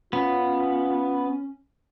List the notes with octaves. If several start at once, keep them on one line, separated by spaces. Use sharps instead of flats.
B3 C#4 F4